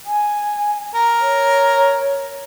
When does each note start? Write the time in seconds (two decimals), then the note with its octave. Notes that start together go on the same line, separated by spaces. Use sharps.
0.06 G#5
0.95 A#4
1.20 C#5